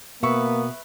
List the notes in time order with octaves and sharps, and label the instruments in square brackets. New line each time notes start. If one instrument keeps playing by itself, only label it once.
[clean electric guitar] B2 [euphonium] A#3 [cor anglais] B3 [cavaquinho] B4 E5 C#6